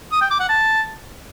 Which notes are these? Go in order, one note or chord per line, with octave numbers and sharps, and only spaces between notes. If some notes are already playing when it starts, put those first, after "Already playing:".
D#6
G5
D6
F#5
A5